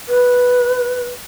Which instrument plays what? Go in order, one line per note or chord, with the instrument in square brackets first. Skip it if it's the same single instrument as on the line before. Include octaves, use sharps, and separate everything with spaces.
[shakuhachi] B4